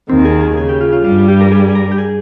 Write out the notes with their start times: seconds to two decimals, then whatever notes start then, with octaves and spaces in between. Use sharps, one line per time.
0.09 D#2 D#3 C4
0.25 G#4
0.41 G#4
0.56 C#3 G#4
0.69 G4
0.81 F4
0.93 F4
1.04 G2 G3 F4
1.28 G4
1.41 A#4
1.52 G#4
1.69 G#4
1.75 A#4
1.92 G4
1.98 G#4